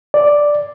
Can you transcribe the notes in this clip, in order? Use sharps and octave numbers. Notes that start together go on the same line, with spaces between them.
D5